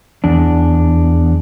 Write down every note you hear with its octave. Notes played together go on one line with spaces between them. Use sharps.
E2 D4